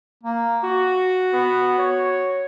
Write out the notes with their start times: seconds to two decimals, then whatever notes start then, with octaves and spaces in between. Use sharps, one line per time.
0.23 A#3
0.63 F#4
1.33 B3
1.79 C#5